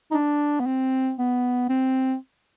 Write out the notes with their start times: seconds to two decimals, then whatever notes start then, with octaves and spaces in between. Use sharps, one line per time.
0.11 D#4
0.14 D4
0.60 B3
0.67 C4
1.19 B3
1.69 C4